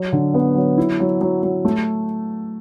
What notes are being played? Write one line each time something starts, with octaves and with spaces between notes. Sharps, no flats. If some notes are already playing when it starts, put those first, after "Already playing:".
Already playing: F#3
D3
B3
F#3
E4
F#3
F#3
F#3
A3